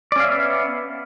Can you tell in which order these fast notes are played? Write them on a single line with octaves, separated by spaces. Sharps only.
D5 C#4 F5 E5 B3